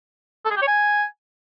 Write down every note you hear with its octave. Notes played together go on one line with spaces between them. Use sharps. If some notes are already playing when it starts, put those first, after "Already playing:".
A4
G#4
G4
C#5
G#5